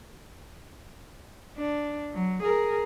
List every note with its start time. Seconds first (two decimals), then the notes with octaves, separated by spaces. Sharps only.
1.57 D4
2.14 F#3
2.43 G#4 A#4